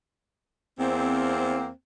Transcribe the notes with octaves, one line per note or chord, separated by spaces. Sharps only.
E2 A#3 C4